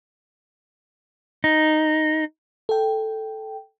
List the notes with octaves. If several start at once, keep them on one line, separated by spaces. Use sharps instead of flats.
D#4
A4 G5